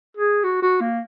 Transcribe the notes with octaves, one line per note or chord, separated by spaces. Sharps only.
G#4
F#4
F#4
A#3